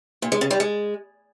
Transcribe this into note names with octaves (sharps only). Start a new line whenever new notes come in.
A#2
G#3
C#3
G3
G#3